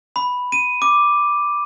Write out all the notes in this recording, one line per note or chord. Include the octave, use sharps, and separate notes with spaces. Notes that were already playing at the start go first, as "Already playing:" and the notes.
B5
D#7
D6